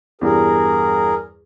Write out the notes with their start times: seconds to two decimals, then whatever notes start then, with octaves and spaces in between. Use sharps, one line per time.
0.21 E2 G2 G#4 A#4